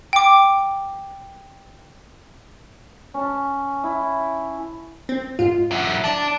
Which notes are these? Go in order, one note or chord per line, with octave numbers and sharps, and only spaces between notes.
G5 D6
C#4 A5
E4
C4
G#2 F4
F#3 E4
D4 A5